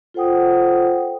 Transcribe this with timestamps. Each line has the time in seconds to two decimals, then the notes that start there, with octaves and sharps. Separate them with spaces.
0.14 F4 A4 C5 F#5 G5 D#6